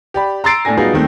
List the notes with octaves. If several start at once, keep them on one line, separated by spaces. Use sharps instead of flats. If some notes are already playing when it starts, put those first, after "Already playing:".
G4 D5 B5
A#5 C6 E6 A6 C7 D7
A2 A3 D4 G#5 A#6
F#3 G3 B3 D#4 F4 G#4
D#2 D#3 G3 A3 C4